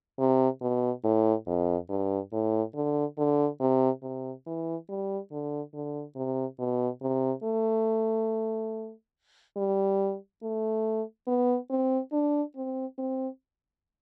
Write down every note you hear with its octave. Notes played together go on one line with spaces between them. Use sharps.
C3
B2
A2
F2
G2
A2
D3
D3
C3
C3
E3
G3
D3
D3
C3
B2
C3
A3
G3
A3
B3
C4
D4
C4
C4